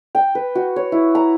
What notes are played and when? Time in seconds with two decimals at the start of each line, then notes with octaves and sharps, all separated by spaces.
0.15 G5
0.35 B4
0.55 F#4
0.76 C#5
0.92 E4
1.15 A#5